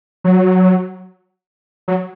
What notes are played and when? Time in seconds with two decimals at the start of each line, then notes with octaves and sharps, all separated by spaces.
0.24 F#3
1.88 F#3